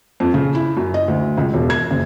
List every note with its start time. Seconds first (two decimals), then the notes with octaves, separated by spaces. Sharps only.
0.20 F2
0.34 C#3
0.55 E4
0.77 F#2
0.94 D#5
1.08 D2
1.38 C#2
1.54 E1
1.70 G#6
1.91 F#1